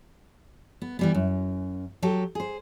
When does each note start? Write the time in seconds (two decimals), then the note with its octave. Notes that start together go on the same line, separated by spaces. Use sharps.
0.82 B3
0.99 E3 G3 B3
1.15 F#2
2.02 F#3 G4 A4
2.35 G#4 C5